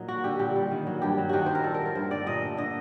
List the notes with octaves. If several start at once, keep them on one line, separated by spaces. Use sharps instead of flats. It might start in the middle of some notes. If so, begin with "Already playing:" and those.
Already playing: A#2 F#3 D#4 A#4
A#3 F#4
D3 G4
A#2 G4
G3
D#3
F#3
G2 G4
F#3
D#3 F#4 G4
F#3 C5
A#4
A#2 A4
A#4
A3
A#4
G2 C5
D3 D5
A#2 D#5
A3
D3 D#5